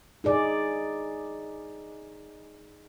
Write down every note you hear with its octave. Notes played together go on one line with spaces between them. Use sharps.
D#4 G#4 D5